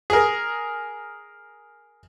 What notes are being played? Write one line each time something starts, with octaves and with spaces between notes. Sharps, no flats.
G#4 A#4